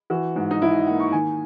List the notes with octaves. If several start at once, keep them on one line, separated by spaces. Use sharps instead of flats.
E3 F#4
G#2
D#4
G#2 E4
A#3 F#5
C#6
D#3 G#5